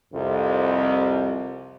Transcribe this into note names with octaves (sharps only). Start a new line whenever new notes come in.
C2 F2